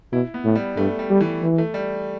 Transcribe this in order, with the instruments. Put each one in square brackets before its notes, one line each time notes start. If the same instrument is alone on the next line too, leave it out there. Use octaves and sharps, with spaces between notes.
[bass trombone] B2 [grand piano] E4
[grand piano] B3
[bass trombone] A2
[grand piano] G3
[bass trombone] G2 [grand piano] A3
[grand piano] G3
[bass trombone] G3
[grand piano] E3
[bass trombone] E3
[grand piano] A3
G3